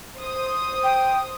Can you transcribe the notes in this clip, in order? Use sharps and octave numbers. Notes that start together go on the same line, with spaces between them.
C5 D#6
G5